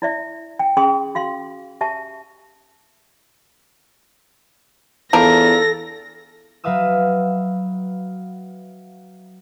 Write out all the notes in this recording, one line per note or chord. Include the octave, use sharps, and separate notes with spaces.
E4 D5 E5
G5
C#4 G#4 G5 C6 D#6
F#4 F5 C6
G4 E5 A5
E2 F3 D4 A4 A#4 A#6
F#3 B4 E5 F5 D#6 E6